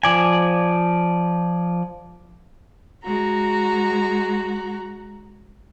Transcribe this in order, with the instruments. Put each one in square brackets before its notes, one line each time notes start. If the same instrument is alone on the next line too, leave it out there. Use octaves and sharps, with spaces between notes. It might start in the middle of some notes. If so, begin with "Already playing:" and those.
[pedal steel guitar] F3 D5 G#5
[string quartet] G#3 F#4 A#5